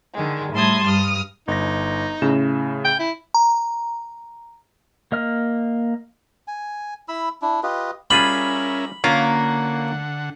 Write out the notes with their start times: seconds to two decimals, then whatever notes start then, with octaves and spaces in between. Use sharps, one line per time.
0.14 D3 D#3 G#3
0.53 A2 G3 A5 C6 D#6 G#6
0.85 G2 D#6 F6
1.48 G1 D#4 A#6
2.22 A2 C#3 E7
2.85 G5
2.99 E4
3.34 A#5
5.12 A#3 D#5 F6
6.48 G#5
7.08 E4 B5 E6
7.42 D4 E4
7.63 F4 G4 B4 D#5
8.10 G3 C#4 F4 G#4 A#4 E5 B5
9.04 D3 A#3 C#4 F4 F5 F#5